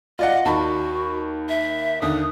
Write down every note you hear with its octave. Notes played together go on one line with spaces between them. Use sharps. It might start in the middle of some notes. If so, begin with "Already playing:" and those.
F4 D5 D#5 F#5
D#2 F#4 A5 B5
E5
D#2 D3 D#6